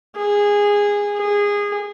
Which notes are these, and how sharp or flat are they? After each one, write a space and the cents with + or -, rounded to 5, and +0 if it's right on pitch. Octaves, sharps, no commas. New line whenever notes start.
G#4 -15
G#4 -20